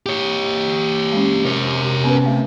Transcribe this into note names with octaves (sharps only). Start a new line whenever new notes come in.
G4 C#5
G#3 C#4
C3 A#4 C#5
B3 C#4 B4
A3